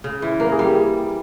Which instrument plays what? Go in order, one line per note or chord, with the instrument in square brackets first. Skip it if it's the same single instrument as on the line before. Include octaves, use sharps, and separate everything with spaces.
[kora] C#3
E3
[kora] A#3 [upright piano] A#4
[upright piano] G#4
[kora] G3
[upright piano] G4